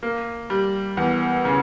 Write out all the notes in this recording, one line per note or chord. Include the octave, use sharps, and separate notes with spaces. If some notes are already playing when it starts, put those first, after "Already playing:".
A#3
G3
E2
C#3